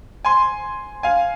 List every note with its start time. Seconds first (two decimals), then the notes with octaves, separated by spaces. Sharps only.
0.25 G#5 C6
1.03 F5 G#5